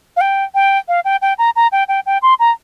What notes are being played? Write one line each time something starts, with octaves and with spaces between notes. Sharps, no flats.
F5
G5
G5
F5
G5
G5
A#5
A#5
G5
G5
G5
C6
A#5